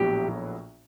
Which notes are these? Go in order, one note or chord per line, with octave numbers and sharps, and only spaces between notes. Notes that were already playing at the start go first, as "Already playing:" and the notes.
Already playing: A#1 A2 F#3 B3 E4 G4